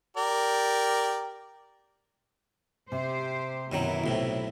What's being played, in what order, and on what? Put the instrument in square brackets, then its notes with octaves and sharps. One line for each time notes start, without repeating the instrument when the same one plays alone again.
[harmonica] G4 A#4 D5
[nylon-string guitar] C3 [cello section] G4 C5
[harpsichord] F#2 D#3 F#3 [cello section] B2 E4
[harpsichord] B1 A2 C3